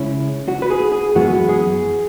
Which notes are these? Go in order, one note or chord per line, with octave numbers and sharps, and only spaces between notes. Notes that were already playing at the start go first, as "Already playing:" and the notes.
Already playing: C#3 G#3 C#4 E4
F#4
B4
G#4
G#4
F#2 E3 G#3 B3 F#4
G#4